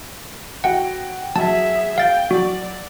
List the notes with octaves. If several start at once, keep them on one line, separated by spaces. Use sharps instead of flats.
F#4 F#5 G5
F#3 G#4 E5 A5
F5 G5 A6
F#3 F#4 D5